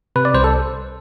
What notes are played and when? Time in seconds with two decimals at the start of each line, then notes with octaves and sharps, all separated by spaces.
0.16 C3 B4
0.25 D5
0.34 C2 C5
0.44 A4